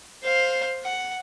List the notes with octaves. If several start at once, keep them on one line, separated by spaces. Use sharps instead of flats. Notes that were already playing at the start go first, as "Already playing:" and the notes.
C5 F5
F#5